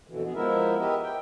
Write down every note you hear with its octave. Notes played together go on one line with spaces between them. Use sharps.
F2 B2 D3 E3
B3 G#4
F3 G#3 B3 E4 A#4 E5
G4 A#4 B4 D#5 E5
G5